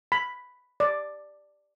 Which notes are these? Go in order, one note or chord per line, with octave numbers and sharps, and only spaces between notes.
B5
D5